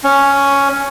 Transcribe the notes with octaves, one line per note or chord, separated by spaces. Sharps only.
C#4